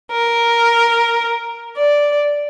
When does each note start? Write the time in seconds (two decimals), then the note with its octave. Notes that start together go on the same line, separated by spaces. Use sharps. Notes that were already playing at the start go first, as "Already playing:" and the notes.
0.12 A#4
1.77 D5